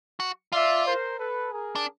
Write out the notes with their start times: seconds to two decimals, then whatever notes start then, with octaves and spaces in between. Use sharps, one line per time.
0.20 F#4
0.52 F4 D5 E5
0.85 A#4 C5
1.18 A4 B4
1.51 G#4 A#4
1.75 D4